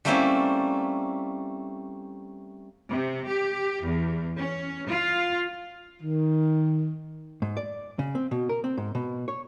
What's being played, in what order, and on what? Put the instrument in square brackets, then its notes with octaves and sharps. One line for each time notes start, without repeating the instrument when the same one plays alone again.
[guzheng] G3 A3 A#3 C4 C#4 E4
[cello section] C3
G4
E2
C#4
F4
[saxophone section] D#3
[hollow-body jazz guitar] G#2
D5
C#3
C4
B2
A#4
C4
G#2
B2
C#5